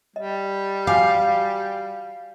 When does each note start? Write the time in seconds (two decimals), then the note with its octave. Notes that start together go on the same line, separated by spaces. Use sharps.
0.16 G3 D#5
0.87 F#4 F5 G#5 D6